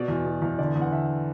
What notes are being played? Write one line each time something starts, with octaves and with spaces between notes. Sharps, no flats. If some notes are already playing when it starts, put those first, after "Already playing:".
Already playing: B2 D5
E2
B2
E2
D3 D5
E2
F#5
D3 E5